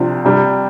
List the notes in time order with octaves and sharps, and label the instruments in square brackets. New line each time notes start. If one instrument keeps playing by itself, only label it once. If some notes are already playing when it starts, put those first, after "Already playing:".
Already playing: [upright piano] C2 C3 F3 D4
C3 G3 D4 G4